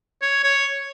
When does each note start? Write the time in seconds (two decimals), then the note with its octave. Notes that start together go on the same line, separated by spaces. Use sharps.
0.22 C#5
0.44 C#5